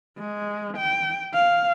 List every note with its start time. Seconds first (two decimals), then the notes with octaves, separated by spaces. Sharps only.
0.19 G#3
0.77 G5
1.34 F5